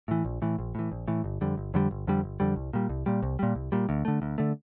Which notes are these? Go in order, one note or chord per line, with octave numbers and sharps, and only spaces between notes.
A2 E3
A#1
A2 E3
A#1
A2 E3
A#1
A2 E3
G1
F2 D3 G3
G1
F2 D3 G3
G1
F2 D3 G3
G1
F2 D3 G3
C2
A#2 G3
C2
A#2 G3
C2
A#2 G3
C2
A#2 G3
D2
D3 A3
D2
D3 A3